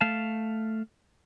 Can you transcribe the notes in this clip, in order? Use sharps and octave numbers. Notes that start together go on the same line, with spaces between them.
A3 F5 A5